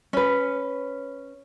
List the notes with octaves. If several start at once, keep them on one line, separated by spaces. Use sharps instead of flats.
C#4 B4